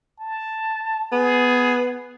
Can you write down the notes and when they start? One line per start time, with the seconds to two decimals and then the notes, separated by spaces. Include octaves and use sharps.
0.20 A5
1.12 B3 G#4